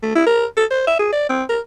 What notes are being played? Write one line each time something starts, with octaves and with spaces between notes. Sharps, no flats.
A3
E4
A#4
A4
C5
E5
G#4
D5
C4
A#4